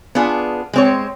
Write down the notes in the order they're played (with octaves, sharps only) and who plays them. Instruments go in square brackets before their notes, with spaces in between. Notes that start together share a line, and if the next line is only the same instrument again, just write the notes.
[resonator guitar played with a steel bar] B3 D4 F4 G#4
G#3 C4 C#5